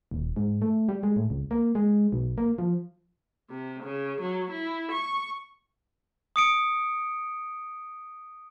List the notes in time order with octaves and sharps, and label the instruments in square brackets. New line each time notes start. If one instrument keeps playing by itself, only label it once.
[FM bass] D#1
G#2
A3
G3
G#3
A2
C#2
A#3
G#3
B1
A#3
F3
[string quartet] C3
C#3
F#3
E4
C#6
[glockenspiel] D#6 C#7 D7